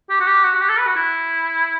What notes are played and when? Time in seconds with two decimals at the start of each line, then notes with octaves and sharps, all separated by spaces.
0.10 G4
0.20 F#4
0.27 G4
0.44 F#4
0.55 F#4
0.61 G4
0.69 A4
0.78 B4
0.87 F#4
0.96 E4